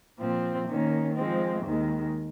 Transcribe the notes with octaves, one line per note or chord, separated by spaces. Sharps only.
A#2 F3 C4
D#3 A#3 C#4
F3 G#3 C4
D#2 D#3 G#3